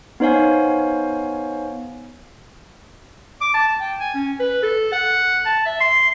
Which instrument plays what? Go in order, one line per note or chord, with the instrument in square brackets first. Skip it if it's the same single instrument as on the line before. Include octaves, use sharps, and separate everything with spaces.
[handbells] B3 D#4 C5 C#5 F5 G#5
[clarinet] D6
A5
G5
G#5
C#4
B4
A4
F#5
A5
E5
C6